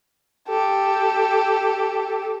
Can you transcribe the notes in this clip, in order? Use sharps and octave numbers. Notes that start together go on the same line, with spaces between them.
G4 A4